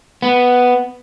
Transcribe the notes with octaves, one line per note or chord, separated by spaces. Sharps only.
B3